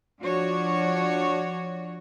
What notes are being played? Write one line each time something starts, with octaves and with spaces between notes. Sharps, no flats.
F3 D4 F#4 C#5